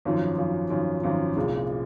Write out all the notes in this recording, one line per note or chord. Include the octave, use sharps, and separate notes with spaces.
G#1 F#2 F3
G#1 F#2 F3
G#1 F#2 F3
G#1 F#2 F3
C2 A#2 G#3